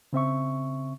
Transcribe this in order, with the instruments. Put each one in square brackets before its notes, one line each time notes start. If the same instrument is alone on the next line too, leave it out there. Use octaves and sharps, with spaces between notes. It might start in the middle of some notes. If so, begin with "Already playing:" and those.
[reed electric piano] C#3 C4 E5 C#6